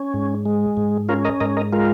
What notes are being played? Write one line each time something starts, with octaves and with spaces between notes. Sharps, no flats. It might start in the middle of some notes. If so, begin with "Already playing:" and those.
Already playing: C#4
G#2
G#3
G#2
C#4 F4 A#4
A#4 D#5
G#2 A#4 D#5
A#4 D#5
G#3 F4 A#4